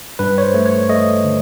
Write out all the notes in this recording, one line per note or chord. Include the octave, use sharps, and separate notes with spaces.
G2 B4
C#5
C5
A3
C#5
A3 D#5
D3